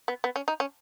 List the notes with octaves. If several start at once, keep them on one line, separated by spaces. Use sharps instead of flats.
B3
B3
C#4
D#4
C#4